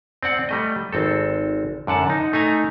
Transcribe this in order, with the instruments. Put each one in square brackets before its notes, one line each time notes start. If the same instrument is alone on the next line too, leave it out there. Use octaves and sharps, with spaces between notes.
[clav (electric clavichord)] C4 D5 F#5
G3 A3 D#5
G#1 C4 A4
F#2 D3 F#5 A5
D#4
A3 D#4 G#5 A#5